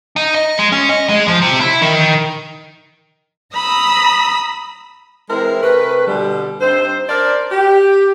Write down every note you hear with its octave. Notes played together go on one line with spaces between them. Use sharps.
D#4
D#5
G#3
C#4
D#5
G#3
F3
C3
E4
D#3
A#5 B5 D#6 E6
E3 G#3 C4 E4 A#4
C3 A3 A#4 B4
B2 D3 G3
G2 C4 D#4 C5
D4 A#4 C5 D5
G4